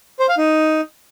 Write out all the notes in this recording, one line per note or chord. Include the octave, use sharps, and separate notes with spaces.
C5
F5
D#4